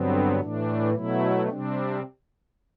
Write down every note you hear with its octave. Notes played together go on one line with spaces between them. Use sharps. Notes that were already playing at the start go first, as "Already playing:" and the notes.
Already playing: G2 D3 F#3 B3 C4
A2 E3 A3 D4
B2 F#3 A3 E4
C3 G3 C4 D4